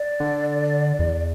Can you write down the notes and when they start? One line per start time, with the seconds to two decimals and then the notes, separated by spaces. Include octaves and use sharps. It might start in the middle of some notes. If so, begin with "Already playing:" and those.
Already playing: D5
0.20 D3
0.99 E2